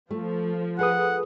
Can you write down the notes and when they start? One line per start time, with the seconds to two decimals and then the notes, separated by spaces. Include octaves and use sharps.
0.11 F3 A3
0.79 A3 G#4 B4 F#5 D#6